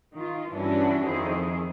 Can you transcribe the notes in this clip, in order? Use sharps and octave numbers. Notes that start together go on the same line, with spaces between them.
D#3 F4
G2 E3 C#4 D4 E4 F#4
F2 D#3 E4 G#4 C5